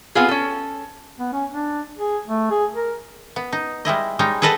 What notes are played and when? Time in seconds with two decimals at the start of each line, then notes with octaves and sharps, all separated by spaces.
0.15 B3 C4 F4 G#4
0.29 C#4 A4
1.19 B3
1.33 C#4
1.51 D4
1.98 G#4
2.26 A3
2.51 G#4
2.74 A#4
3.36 B3
3.53 D#4
3.85 G3 G#3 E4 D#5
4.19 G3 G#3 D#4 C#5
4.42 G#4 A4 B4 D#5 F#5 A5